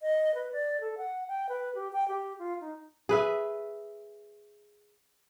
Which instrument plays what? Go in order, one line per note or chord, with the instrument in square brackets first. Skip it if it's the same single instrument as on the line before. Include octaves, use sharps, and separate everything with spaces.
[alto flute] D#5
B4
D5
A4
F#5
G5
B4
G4
G5
G4
F4
D#4
[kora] G#4 B4 E5